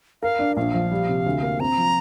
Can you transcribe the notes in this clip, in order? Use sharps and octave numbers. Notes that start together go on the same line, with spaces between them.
A#4 F5
D4
A#1 F5
F3
G3
C3
D2
A#3
C4 A#5
F3